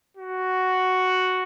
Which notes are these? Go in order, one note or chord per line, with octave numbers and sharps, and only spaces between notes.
F#4